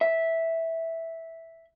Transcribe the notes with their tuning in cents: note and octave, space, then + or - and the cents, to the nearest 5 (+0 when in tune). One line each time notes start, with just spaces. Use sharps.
E5 -5